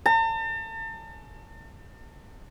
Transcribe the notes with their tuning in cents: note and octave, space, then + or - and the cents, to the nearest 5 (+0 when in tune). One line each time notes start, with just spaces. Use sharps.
A5 +40